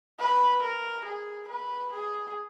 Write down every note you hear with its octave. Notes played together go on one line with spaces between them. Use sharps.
B4
A#4
G#4
B4
G#4